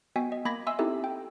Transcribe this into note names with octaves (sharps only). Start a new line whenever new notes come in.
B3 F#4 D#5 G5 G#5 B6
D#5
A#3 B5 D6 G#6 A#6 B6
D#5 E5 G#5 C6 E6
C4 D#4 E4 G4 A4 E5
G5